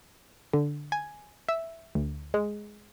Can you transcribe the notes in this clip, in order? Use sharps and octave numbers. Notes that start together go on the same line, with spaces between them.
D3
G#5
E5
D2
G#3